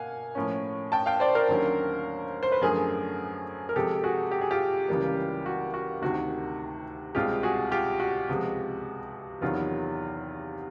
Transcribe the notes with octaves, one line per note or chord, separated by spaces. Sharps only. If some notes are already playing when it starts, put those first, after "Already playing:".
Already playing: B2 A#3 F5 F#5 G#5
A2 F3 A#3 C#4
G5 A5
F5 G5
C5 D5
A#4 C5
D#2 D3 F#3 A#3 C#4
C5
B4
F#2 D3 F3 A3 G#4 A#4
A#4
C3 F3 G#3 G4 A4
F#4 G#4
G4
G#4
F4 G4
C#2 C#3 E3 G3 A#3
F#4
F#4
D2 C3 D#3 F#4
C2 B2 G#3 C4 F4 G4
F#4 G#4
F4 G4
F#4
C#2 C3 F3 G#3
E2 C3 D#3 F#3 B3 F4